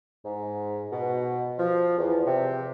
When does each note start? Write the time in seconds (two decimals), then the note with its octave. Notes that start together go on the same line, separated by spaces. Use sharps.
0.24 G#2
0.92 B2
1.58 F3
1.98 E2
2.26 C3